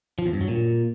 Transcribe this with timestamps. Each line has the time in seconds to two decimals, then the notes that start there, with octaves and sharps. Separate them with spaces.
0.19 F3
0.26 E2
0.33 G2
0.41 F#3
0.48 A#2